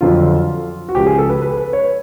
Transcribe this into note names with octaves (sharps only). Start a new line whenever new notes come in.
F2 D3 F#3 F4
F#4
C#2 C#3 F3 G4
G#4
A4
B4
B4
B4
C#5